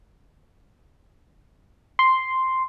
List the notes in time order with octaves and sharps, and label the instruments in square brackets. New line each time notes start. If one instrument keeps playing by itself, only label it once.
[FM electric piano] C6